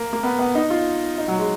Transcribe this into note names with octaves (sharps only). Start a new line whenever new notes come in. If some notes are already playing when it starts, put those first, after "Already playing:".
Already playing: A#3
A#3
B3
B3
D#4
F4
D#4
F#3
G#3